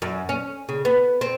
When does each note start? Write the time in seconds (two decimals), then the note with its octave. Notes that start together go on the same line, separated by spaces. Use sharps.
0.02 F#2
0.29 C#4
0.69 C#3
0.85 B3
1.21 C4